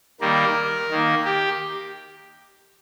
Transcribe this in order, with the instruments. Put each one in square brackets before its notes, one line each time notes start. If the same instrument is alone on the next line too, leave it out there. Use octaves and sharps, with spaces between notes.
[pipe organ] D#3 G3 A#3 A#4
D#3 A#3
G4